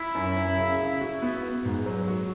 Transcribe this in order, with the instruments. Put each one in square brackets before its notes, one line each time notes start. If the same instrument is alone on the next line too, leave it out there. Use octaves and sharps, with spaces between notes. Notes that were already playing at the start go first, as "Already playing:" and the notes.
Already playing: [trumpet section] E4
[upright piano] F#2
F#2
C#3
C#3
F#4
B3
B3
G#2
F#3
F#4